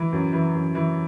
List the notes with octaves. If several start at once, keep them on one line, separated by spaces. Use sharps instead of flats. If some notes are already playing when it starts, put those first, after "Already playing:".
Already playing: E3
F#2
E3
F#2
E3